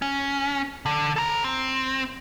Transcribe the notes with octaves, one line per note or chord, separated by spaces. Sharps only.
C#4
D3
A4 A#5
C4